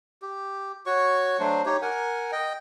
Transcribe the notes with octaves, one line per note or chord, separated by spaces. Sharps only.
G4
F#4 C#5 C#6
F#3 A3 D4 C5
D#4 G4 C#5
A#4 F#5 G#5
D#5 G5